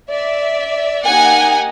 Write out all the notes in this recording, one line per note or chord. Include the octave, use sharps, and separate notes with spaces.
D5 E5
A#3 D#4 G4 F#5 G#5